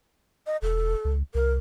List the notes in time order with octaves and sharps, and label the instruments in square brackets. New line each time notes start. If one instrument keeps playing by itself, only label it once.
[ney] D#5
[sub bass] E1 [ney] A4
[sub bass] C#2
[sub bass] C2 [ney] A#4